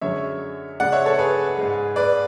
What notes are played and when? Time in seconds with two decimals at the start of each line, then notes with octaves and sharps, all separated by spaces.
0.01 F#2 D3 G#3 C#5 E5
0.80 C#2 C#3 G#3 D5 F#5
0.92 C#5 E5
1.06 A4 C#5
1.19 G#4 B4
1.58 G#2 G#3
1.96 B4 D5